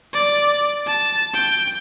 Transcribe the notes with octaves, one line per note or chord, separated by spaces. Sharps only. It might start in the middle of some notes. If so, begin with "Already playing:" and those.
D5
A5
G5